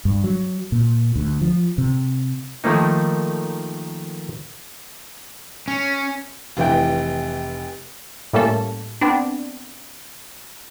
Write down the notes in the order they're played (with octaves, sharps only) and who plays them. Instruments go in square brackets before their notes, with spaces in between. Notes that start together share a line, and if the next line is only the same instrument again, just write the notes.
[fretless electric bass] G2
F#3
A#2
D2
F3
C3
[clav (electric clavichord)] D#3 F3 A3 A#3 D#4
[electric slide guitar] C#4
[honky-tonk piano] F1 E3 G5
[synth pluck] A2 G3 A3 A#3 C#4 A4
B3 C4 D4